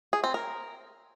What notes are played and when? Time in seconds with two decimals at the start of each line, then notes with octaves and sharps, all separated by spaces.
0.13 G#4
0.24 C4
0.34 A#4